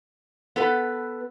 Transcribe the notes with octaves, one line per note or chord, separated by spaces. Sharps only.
B3 A4 B4